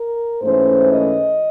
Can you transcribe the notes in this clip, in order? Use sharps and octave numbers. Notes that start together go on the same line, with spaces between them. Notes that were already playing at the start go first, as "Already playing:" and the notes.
Already playing: A#4
G#2 E3 A3 C#4 C5
D#5